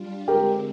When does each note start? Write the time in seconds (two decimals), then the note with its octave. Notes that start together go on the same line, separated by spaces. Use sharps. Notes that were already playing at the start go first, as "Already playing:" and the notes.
Already playing: G3 D4 F4
0.28 D3 G#3 C4 G4 A#4